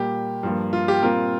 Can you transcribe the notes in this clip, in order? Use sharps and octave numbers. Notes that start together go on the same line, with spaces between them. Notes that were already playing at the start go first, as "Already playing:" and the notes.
Already playing: A#2 G3 A#3 G4
G2 F3 A#3
F4
G4
A#2 G3 C4 F4 A#4